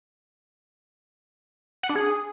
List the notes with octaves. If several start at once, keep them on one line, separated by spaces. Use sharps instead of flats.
F#5
D4
G#4